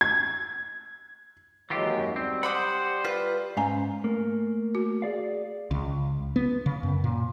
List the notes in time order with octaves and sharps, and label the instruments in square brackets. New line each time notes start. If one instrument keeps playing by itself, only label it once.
[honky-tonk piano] G#6
[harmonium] D#2 F#3 G#3 [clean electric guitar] E3 F4 G4
[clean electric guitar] F#2
[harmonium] G3 [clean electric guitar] C4
[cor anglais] C5 [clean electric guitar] F#5 [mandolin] B5 D6 D#6
[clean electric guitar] F4 [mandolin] B4
[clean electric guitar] G#2 F5 [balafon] C#4 G#5 A#5
[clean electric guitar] A3 A#3
[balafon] F#4
[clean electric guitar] G#4 D5 F5
[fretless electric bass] C#2
B3
C#3
F#2
A#2